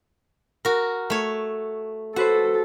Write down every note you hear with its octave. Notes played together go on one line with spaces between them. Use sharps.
F#4 A#4
A3 C#5
F#4 A4 B4 C5 F#5